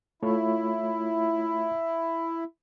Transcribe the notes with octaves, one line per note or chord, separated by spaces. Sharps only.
A3 E4 F4 C#5